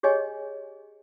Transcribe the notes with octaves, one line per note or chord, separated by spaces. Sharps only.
G4 G#4 C#5 D#5 G#5